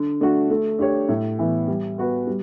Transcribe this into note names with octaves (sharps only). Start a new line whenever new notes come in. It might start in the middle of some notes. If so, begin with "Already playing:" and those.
Already playing: D3
A3 D4 F#4
A3
D4 G4 C#5
A2
E3 B3
G3
B3 F#4 B4
G3